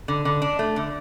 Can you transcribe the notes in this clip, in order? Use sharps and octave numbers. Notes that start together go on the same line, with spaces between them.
D3
D3
D4
A3
D3